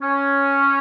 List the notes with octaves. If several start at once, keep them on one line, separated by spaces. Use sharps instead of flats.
C#4